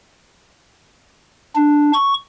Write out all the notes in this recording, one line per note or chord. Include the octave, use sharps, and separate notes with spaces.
D4
C#6